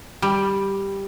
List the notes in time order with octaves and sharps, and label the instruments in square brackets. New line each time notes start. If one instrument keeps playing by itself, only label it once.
[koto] G3